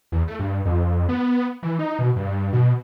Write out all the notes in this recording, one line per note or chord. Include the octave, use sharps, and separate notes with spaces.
E2
A3
G2
F2
B3
E3
D#4
B2
G2
B2